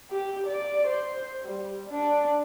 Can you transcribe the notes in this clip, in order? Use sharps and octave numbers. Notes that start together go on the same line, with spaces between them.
G4
D5
C5
G3
D4